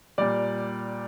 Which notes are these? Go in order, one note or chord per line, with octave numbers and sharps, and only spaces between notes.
A#2 G3 D5